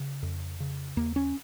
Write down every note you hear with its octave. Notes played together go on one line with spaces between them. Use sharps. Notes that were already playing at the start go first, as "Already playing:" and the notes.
Already playing: C#3
F2
C#3
D#2 A#3
C#4